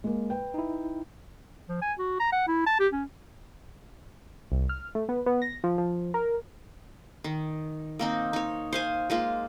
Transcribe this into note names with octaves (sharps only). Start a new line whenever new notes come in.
G#3 A#3
B4 G5
D#4 E4
F3
G#5
F#4
A#5
F#5
E4
A5
G4
C#4
C2
F6
A3
B3
B3
A#6
F3
F3
A#4
D#3
A#3 C4 D#4
D#4 C#5
C5 F5 G#5
G#3 A#3 F4